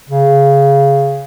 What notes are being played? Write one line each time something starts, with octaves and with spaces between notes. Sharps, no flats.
C#3